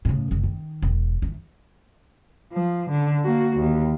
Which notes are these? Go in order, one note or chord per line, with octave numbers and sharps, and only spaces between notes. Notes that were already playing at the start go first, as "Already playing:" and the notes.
A2 C#3
F#1 D2
D#3
E1
D#3 E3
F3
D3
A#3 F#4
D#2